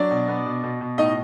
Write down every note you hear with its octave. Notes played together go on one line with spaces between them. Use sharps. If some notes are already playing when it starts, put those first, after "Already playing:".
Already playing: F#3 D4 D5
B2
B3
B2
B2
B2
A2 D#4 D#5